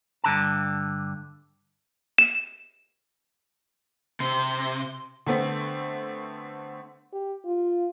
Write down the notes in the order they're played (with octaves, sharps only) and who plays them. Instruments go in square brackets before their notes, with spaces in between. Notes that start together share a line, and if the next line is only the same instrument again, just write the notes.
[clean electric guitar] G2 D3 A5
[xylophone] E7
[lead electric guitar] C3 [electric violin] C6
[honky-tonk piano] D3 A3 B3 C4
[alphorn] G4
F4